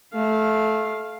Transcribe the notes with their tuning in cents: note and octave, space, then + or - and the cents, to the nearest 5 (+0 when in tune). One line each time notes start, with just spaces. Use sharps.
A3 -20 F5 +0